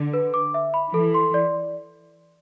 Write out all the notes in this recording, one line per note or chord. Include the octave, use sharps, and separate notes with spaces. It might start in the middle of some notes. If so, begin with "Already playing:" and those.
Already playing: D3
B4
D6
E5
B5
E3 A4
C6
D5